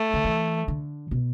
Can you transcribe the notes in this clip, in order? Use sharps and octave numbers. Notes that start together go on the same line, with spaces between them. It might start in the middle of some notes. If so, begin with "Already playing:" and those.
Already playing: A3
D3
E3
D3
B2